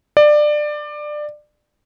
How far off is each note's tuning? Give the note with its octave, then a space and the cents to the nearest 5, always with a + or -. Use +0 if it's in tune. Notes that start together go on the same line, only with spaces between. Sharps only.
D5 +20